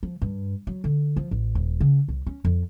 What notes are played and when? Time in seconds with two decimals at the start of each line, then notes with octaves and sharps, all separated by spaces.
0.03 F3
0.22 G2
0.67 F#3
0.84 D3
1.16 F3
1.31 A1
1.55 D#1
1.80 C#3
2.09 C2
2.27 C#4
2.45 F2